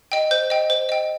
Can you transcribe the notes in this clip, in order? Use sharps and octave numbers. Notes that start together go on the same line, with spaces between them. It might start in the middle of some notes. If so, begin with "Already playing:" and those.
D#5 G5
C5 G6
D#5 G5
C5
D#5 G5